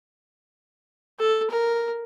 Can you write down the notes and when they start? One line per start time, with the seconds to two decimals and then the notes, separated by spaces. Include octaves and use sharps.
1.19 A4
1.50 A#4